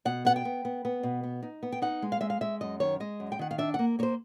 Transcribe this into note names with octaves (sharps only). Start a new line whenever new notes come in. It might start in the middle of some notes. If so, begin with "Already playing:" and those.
B2 F#5
B3 F#5
G5
B3
B3
B3
B2
B3
D#4
B3
G5
D#4 F#5
G#3
F5
G#3 E5
F5
G#3 E5
F#2 D#5
D#3 C#5
G#3 D#5
F#2
G5
D#3 F#5
F5
D4 E5
A#3 F#5
A#3 C5 C#5